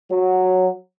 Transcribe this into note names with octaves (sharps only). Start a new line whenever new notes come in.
F#3